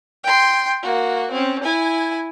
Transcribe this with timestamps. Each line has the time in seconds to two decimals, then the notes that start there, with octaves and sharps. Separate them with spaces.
0.24 G5 C6
0.83 A#3 F#4
1.31 C4 C#4
1.63 E4 G#5